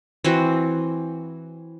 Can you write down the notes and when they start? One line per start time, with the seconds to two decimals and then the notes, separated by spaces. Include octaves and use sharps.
0.24 E3 C4 F#4